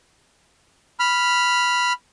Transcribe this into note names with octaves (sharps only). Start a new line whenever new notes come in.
B5 F6